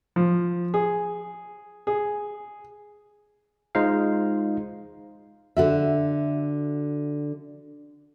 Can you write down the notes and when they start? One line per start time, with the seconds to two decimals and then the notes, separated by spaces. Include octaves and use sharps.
0.16 F3
0.74 G#4
1.87 G#4
3.75 G#3 D#4 F4 C5 F5
5.57 D3 F#4 E5